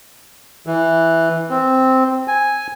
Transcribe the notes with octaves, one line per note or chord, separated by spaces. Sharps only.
E3
C4
G#5